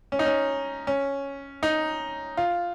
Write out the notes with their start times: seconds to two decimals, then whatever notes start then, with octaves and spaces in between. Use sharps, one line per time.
0.12 C#4
0.19 D#4
0.26 C#4
0.87 C#4
1.63 D#4
2.37 F4